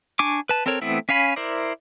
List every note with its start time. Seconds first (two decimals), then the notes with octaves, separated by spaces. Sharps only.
0.19 D4 G#5 C#6 D6
0.49 B4 A5
0.66 C4 A4 A#4 C#5
0.82 E3 A3 B3 C4 E4
1.09 C#4 C#5 F5 G#5 B5
1.36 E4 A#4 C5 D5